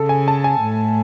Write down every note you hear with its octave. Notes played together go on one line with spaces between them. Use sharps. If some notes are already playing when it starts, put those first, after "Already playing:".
Already playing: C#3 A4
G#5
A5
G#5
A2